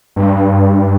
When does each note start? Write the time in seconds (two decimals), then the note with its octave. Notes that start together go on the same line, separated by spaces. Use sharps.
0.16 G2